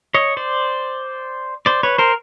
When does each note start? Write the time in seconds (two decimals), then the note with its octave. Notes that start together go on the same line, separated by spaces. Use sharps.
0.14 C#5 D#5
0.37 C5 D5
1.66 C5 D5
1.83 B4 C#5
1.98 A#4 C5